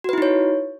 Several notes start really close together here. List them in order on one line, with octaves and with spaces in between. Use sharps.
F#4 B4 E4 D#4 C#5